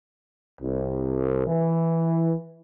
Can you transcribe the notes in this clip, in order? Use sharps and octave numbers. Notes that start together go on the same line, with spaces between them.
C2
E3